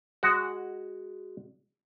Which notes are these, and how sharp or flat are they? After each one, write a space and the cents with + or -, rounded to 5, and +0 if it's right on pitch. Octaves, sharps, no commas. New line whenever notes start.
G#3 -10 F#4 +0